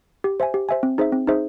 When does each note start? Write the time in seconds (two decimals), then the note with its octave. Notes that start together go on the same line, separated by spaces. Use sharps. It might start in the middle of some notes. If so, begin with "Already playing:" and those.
0.24 G4
0.40 C5 E5 G#5
0.54 G4
0.69 C5 E5 G#5
0.83 C4
0.98 D#4 G#4 C5 E5
1.12 C4
1.27 D#4 G#4 C5 E5